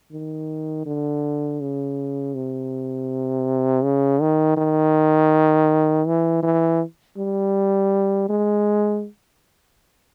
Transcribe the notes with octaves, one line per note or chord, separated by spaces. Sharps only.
D#3
D3
C#3
C3
C#3
D#3
D#3
E3
E3
G3
G#3